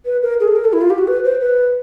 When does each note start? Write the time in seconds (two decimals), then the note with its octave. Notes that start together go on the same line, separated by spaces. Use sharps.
0.05 B4
0.22 A#4
0.40 G#4
0.48 A4
0.56 A#4
0.65 A4
0.73 E4
0.81 F4
0.90 G4
0.98 F#4
1.08 B4
1.24 C5
1.40 B4